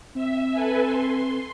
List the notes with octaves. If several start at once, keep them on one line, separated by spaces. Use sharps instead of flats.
C4 E5
A4 B4 G#5
C6